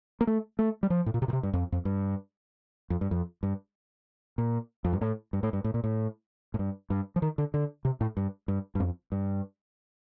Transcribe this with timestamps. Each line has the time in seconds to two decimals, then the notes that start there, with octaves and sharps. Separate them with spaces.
0.21 A#3
0.27 A3
0.59 A3
0.83 G3
0.90 F3
1.06 A2
1.14 A#2
1.22 C3
1.28 A#2
1.33 C3
1.43 G2
1.53 F2
1.72 F2
1.85 G2
2.90 F2
3.01 G2
3.11 F2
3.43 G2
4.38 A#2
4.85 F2
4.93 G2
5.01 A2
5.33 G2
5.43 A2
5.53 G2
5.64 A2
5.74 A#2
5.84 A2
6.54 A2
6.59 G2
6.90 G2
7.16 F3
7.22 D#3
7.38 D3
7.54 D3
7.85 C3
8.01 A2
8.17 G2
8.48 G2
8.75 G2
8.80 F2
9.12 G2